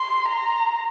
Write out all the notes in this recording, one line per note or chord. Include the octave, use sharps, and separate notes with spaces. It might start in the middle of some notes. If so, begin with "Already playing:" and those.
Already playing: C6
A#5